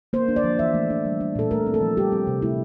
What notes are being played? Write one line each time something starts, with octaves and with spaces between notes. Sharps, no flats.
A#3 C5
D4
D5
F3
E3 E5
A3
D4
G3
D4
A#2 A4
A3 A#4
C4
A4
F3
G3 G4
C4
C3
A3 E4